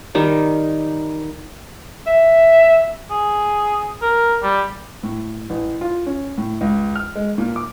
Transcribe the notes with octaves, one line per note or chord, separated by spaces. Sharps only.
D#3 G3 D#4
E5
G#4
A#4
G3
A2
A1
F4
C#4
A2
C#2
F6
G#3
A#2
D6